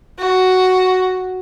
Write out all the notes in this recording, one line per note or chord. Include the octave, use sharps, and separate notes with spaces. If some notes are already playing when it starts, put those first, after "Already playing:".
F#4